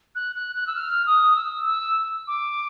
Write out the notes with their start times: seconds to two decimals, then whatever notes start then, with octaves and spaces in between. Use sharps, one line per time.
0.15 F#6
0.36 F#6
0.55 F#6
0.67 E6
0.76 F6
1.06 D#6
1.36 E6
1.66 E6
2.28 D6